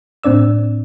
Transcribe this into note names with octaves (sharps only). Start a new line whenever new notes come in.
A2 C4 D4 D5 E6